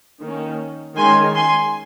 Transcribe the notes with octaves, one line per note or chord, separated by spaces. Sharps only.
D#3 A#3 C#4
D#3 G#3 C#4 G#5 C6
G#5 C6